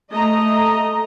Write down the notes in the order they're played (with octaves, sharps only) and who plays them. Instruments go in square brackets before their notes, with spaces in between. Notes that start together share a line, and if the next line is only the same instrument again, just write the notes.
[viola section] A3 D#5 A#5